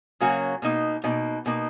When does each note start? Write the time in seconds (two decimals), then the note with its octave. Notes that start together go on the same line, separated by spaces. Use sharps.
0.20 C#3 F#3 A#3 C#4 F#4
0.62 B2 A#3 D#4
1.04 B2 A#3 D#4
1.46 B2 A#3 D#4